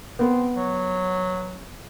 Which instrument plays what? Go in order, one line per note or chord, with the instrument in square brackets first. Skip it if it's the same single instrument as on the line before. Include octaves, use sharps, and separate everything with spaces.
[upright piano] B3 [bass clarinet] C4
[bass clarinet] F#3